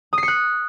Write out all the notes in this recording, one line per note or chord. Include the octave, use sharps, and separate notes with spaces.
D#6
C7
C#7
F#6